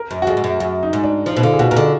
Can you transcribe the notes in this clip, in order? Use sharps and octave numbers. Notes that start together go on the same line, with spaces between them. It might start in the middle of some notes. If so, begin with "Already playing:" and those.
Already playing: A#4
F#2
F#4
F2 G#4
G#2
F#2
F#2 F#4
D#4
G#2
D4
F3 D#4
B2
D3 F4
G#4
B2 F#4
B2 A#4
D3 G#4